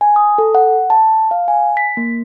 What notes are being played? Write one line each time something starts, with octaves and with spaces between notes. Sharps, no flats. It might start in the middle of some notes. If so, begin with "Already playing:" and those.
G#5
D#6
A4
F#5
A5
F5
G#5
B6
A#3